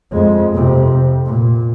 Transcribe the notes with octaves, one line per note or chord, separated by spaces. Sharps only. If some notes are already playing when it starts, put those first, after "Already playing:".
F2 G#3
F2 C3
A#2